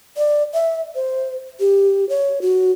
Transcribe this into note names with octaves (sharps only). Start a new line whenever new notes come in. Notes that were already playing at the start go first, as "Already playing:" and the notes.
D5
E5
C5
G4
C#5
F#4